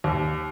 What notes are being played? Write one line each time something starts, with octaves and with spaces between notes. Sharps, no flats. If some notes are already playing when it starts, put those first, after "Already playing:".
D#2